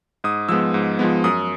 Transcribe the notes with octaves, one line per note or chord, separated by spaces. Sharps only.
G#2 D#6
F3 G#3 B3 E6
G#2
F3 G#3 B3
F#2 D#6